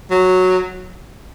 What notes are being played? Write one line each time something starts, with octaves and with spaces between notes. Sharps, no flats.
F#3